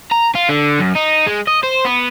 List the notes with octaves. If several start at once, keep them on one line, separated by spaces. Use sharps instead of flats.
A#5
F4
D3
F#2
D#4
G#3
D#5
C5
B3